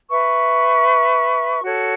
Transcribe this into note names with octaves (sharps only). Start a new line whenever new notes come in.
B4 E5 C#6
F#4 A4 C#5